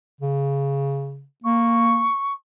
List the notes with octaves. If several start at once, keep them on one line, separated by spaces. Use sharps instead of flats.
C#3
A#3 C#6